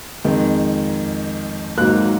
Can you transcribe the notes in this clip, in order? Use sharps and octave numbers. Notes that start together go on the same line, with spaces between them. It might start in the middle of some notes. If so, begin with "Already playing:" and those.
F2 D#3 G#3
G#1 G#2 F#3 A#3 F#6